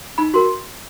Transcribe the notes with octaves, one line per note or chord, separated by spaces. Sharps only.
D#4 B5
F#4 A#4 C6